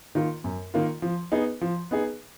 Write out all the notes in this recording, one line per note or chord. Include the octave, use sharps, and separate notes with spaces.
D#3 A#3 F4
F#2
D#3 A#3 F4
F3
B3 D#4 G#4
F3
B3 D#4 G#4